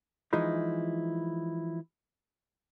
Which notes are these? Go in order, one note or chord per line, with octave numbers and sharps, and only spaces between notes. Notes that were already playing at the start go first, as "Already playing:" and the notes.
E3 F3 G#3 D#4 E4